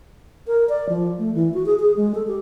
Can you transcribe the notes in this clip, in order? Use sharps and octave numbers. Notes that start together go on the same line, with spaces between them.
A#4
D5
F3
A3
E3
F#4
G#4
G#4
G#3
A4
G4